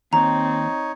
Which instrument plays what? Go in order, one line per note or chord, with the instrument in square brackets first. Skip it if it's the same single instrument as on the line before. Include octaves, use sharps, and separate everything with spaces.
[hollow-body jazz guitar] D#2 [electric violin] C4 [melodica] D#4 C#5 [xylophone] A#5